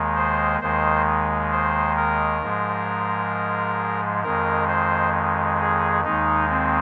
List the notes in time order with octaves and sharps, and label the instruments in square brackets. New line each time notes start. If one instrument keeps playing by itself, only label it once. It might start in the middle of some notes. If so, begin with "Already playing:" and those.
Already playing: [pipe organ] D#2 D#3 G#3
C5
D#2 D#3 G#3 C5
C5
A#4
G#2 F3 G#3
F2 D#3 G#3 A#4
C5
G#4
D#2 D#3 G#3 D#4
C4